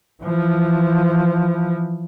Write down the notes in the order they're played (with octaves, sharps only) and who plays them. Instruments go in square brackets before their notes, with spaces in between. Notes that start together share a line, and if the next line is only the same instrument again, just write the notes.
[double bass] E3 F3